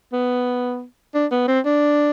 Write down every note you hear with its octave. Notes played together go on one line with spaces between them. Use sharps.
B3
D4
B3
C4
D4